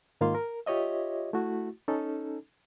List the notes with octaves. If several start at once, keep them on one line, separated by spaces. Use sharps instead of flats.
G#2 D#3 A#3 F4 F5 C6
A#4
F4 G4 C#5 D#5 E5
A3 E4 F#4
C#4 D#4 A4